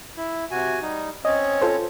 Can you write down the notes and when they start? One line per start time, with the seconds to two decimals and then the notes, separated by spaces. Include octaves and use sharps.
0.17 E4
0.51 C3 F#4 G#5
0.82 G3 D#4
1.25 C4 C#4 C#5 D#5
1.61 F4 A4 C5